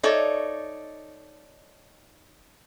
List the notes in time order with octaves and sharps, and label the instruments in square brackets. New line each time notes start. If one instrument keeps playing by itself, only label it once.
[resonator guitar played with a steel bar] D#4 A4 C#5 D5 E5